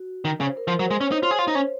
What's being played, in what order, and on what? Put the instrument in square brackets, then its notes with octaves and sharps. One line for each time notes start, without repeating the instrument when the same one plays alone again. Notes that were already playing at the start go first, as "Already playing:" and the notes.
Already playing: [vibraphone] F#4
[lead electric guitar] D#3
C#3
[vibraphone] C5
A#4
[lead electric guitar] F3
[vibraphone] C5
[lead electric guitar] F#3
[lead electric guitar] G#3 [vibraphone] C5
[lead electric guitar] C#4 [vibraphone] C#5
[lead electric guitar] D#4 [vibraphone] C5
[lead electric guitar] F4
G#4
F4
D#4
C#4